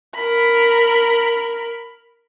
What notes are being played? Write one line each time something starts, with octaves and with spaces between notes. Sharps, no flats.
A#4 B5